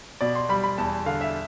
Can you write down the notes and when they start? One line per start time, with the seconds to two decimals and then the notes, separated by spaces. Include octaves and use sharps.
0.21 B2 D5
0.35 C6
0.49 G3 B5
0.64 B5
0.78 E2 A5
1.06 D3 F5
1.21 E5